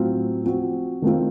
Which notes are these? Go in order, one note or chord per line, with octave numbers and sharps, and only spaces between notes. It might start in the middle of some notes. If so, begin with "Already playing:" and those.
Already playing: A2 F#3 C4 F4
F3 C4 F#4
D#3 A3 C4 F4